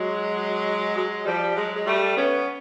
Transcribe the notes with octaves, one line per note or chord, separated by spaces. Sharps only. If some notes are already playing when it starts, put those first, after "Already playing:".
Already playing: F#3 G#3
F#3 G#3
F3 G3
F#3 G#3
G#3
G3 A3
B3 C#4